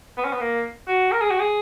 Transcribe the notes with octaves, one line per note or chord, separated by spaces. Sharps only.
B3
C#4
B3
A#3
F#4
A#4
G#4
F#4
G#4